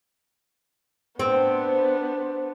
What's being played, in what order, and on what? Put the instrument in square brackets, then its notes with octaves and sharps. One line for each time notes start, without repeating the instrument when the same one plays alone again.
[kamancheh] B3 D4 [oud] C4 [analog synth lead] C5